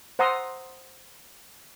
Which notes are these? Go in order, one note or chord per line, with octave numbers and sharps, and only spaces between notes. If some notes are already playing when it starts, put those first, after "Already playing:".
C5 F#5 A#5 C6 D#6 E6